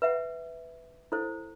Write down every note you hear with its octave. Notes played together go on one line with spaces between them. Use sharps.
B4 E5 F#5
E4 A4 C5